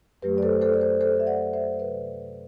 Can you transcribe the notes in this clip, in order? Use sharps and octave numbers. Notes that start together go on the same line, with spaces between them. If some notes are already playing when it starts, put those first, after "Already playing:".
F#2 F#3 A3 G4 B4
D5
A4 C5
A4 C5
D5
A4 C5
A4 C5
E5
D5 F#5
C5 E5
C5
C3 F#3 B4 D5